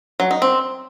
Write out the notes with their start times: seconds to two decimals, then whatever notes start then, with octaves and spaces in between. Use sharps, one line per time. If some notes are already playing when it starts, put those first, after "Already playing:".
0.20 F#3
0.31 D#4
0.42 C4